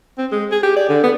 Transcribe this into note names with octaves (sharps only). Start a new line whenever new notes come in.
C4
G#3
G#4
G4
D5
D3
B3